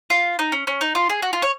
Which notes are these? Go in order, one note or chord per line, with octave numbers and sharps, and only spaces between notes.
F4
D#4
C#4
C#4
D#4
F4
G#4
F#4
F4
C#5